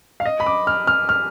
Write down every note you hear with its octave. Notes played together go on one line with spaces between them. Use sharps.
F5
D#5
B5
D6
F6
F6
F6